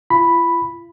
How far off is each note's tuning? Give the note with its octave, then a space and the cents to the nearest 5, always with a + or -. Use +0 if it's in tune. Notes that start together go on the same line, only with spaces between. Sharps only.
F4 -40 B5 +0